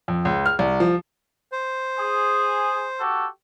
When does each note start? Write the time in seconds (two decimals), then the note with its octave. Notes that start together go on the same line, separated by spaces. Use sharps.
0.08 F2
0.25 C#2
0.46 F6
0.59 C2
0.80 F3
1.52 C5
1.99 G#4
3.00 F#4 G4 A4